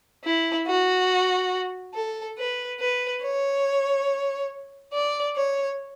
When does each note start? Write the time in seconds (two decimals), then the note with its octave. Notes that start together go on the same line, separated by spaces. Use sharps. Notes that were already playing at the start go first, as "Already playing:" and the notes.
0.24 E4
0.67 F#4
1.94 A4
2.38 B4
2.80 B4
3.23 C#5
4.93 D5
5.36 C#5